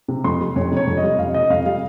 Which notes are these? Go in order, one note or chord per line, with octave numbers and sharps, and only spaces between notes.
C3
F2 C6
G3
F2 C#5
C3
C#5
F2
D#5
G3
F2 F5
C3 D#5
F2 F5
G3 F5